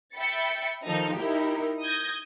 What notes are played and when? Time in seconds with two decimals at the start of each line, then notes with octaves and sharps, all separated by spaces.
0.13 E5 G5 B5 A6 C#7
0.86 D#3 F3 D#4 A4
1.16 D#4 E4 G4 A#4
1.82 D#6 G6 G#6 A#6